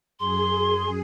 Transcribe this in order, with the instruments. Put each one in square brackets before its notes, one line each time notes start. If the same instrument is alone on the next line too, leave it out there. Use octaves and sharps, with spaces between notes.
[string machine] F#2 G#4 [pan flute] C6